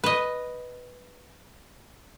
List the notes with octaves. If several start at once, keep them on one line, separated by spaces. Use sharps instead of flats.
B4 D#5